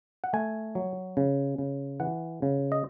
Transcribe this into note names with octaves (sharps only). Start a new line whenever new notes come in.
F#5
A3 G#5
F#3
C#3
C#3
E3 F#5
C#3
D#5